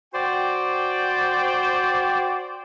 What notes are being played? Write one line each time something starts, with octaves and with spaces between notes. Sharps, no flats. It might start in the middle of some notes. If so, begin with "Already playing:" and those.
F#4 C5 D5 G5